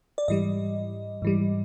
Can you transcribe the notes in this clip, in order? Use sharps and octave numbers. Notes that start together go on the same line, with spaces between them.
D5
G#2 E3 G3 D#5
G#2 E3 G3